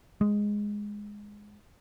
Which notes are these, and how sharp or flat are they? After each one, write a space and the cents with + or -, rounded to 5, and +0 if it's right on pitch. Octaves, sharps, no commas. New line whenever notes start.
G#3 -5